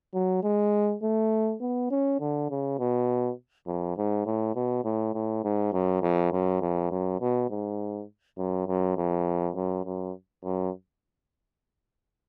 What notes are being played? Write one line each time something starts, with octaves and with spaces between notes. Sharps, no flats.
F#3
G#3
A3
B3
C#4
D3
C#3
B2
F2
G#2
A2
B2
A2
A2
G#2
F#2
F2
F#2
F2
F#2
B2
G#2
F#2
F#2
F2
F#2
F#2
F#2